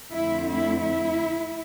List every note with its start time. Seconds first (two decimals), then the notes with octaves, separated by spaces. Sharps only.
0.13 F2 D3 A3 C4 E4
0.48 E4
0.82 E4